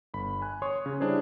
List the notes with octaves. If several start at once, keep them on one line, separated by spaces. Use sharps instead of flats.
G1 B5
G#5 F#6
C#5 C6 C#6 D#6
C#3
G3 D4 E4 G#4 C5 C#5